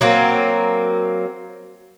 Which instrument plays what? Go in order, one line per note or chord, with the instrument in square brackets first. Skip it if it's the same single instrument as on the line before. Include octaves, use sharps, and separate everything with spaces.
[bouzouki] F#3 A#3 C4